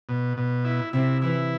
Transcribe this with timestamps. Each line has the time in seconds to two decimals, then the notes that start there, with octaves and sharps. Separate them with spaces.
0.09 B2
0.37 B2
0.65 E4
0.93 C3 E4
1.22 E3 E4